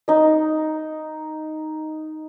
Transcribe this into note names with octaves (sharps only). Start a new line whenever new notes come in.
D#4 D#5